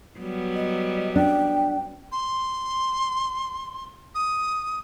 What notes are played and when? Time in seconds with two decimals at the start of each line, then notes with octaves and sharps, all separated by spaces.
0.19 F#3 G3 B3
0.54 D#5
1.16 D4 G5
2.12 C6
4.15 D#6